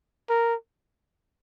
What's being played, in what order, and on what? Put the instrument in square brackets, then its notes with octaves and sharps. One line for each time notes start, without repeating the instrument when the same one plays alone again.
[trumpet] A#4